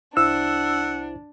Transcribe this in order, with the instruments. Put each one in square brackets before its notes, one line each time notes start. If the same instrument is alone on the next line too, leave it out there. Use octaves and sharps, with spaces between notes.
[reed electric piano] C2 E4 C5 [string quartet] D4 [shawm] F#5 [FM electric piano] E6